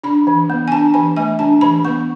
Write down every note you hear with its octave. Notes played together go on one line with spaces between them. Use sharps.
D4 B5
E3
B3
G#5
D4 A5
E3 G#5
A3 G#5
D4 A5
E3 B5
B3 C#6